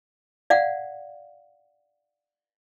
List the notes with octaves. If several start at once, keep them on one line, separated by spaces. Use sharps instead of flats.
D5 F5 F#5